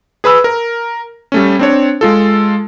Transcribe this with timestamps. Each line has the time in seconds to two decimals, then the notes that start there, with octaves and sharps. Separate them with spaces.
0.24 G#4 B4 B5 E6
0.44 A#4
1.32 G3 A3 C#4
1.59 C4 D4 C#5
2.01 G#3 F4 A4